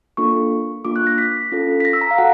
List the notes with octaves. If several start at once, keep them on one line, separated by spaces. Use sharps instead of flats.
A#3 D4 F4 A4 C#6
A#3 D4 F4 D6
F#6
A#6
B6
C#4 F4 A4
B6
A#6
E6
A#5
F5
F#4 A4 F#5